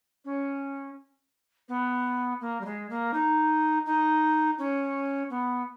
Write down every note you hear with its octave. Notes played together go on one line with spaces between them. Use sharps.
C#4
B3
A#3
G3
G#3
A#3
D#4
D#4
C#4
B3